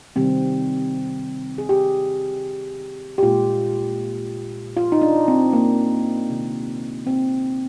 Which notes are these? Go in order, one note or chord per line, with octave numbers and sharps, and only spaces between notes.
C3 D#3 G3 C4
G#4
G4
G4
A#2 G#3 F4
F4
D#4
D4
C4
A#3
C3 D#3 G#3
C4